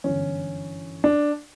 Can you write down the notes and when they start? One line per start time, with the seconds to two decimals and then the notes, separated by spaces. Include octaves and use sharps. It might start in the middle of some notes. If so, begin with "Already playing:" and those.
0.04 G1 F#2 E3 C#4
1.04 D4